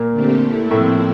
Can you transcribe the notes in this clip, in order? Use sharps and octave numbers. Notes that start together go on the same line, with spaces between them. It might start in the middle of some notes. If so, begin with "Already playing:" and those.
Already playing: A#2 A#3
D3 A3 C4 G4
A3 E4 A4
A2 C3 F3 A3 C4 E4